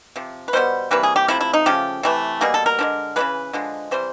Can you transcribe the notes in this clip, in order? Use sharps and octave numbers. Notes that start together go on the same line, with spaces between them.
C3 F3
B4
B2 G3 B3 C5
C3 E3 G3 A#3 B4
G#4
G4
C3 F3 A3 E4
E4
D#4
C#3 F3 A3 G4
C3 E3 A3
B2 G3 A#3 G#4
A4
A#4
D3 F3 G#3
C#3 E3 G#3 B4
D3 F3 G#3
C3 E3 G3 C5